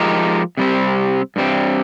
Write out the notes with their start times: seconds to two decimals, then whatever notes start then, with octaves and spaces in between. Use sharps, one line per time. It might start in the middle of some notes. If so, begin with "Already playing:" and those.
Already playing: F3 G#3 D#4 G4 A#4
0.57 C3 G3 C4
1.36 G2 G3 C4